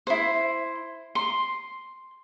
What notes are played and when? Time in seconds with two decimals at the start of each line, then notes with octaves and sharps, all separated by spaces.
0.07 E4 C5
1.15 C6